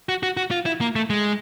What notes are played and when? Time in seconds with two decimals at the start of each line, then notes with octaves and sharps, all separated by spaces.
0.09 F#4
0.23 F#4
0.37 F#4
0.51 F4
0.66 E4
0.81 A#3
0.96 A3
1.10 G#3